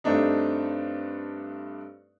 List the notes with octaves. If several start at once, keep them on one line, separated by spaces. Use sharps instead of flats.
G2 A3 C4 D4 D#4